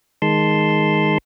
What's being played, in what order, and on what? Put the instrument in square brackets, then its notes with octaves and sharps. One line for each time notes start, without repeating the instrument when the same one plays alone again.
[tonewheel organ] D#3 G#3 A5 C6